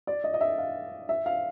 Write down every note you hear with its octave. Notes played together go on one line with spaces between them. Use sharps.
D5
D#5
D#5
E5
F5
E5
F5